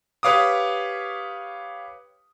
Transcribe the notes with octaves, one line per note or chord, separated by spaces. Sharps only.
G4 B4 C#5 F5 D6 D#6